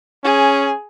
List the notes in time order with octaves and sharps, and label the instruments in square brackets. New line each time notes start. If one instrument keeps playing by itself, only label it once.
[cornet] C#4 [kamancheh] G#4